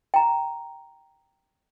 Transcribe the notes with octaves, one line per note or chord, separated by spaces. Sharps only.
G5 A#5